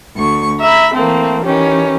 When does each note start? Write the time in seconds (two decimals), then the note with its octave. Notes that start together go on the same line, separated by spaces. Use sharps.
0.16 D2 C#6
0.60 E5 A#5 B5
0.94 E3 A3 A#3 C4
1.44 D#3 E3 C#4 G4